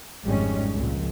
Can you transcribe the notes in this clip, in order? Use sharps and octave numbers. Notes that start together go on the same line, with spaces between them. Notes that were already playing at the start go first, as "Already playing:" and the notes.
G#1 F2 G3 G#3 C#4
C#2 A#2 F3